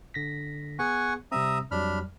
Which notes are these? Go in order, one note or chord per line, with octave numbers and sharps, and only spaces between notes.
D3 A#6 B6
B3 G#4 F#5 G#5 C#6
C3 G3 C4 E5 A#5 D#6
F2 F#3 G3 D4 B5 F6